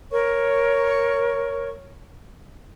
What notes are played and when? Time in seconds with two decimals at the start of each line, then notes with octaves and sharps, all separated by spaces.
0.12 A#4 C#5 C#6